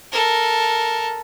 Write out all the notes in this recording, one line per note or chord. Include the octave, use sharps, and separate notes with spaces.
A4 A#4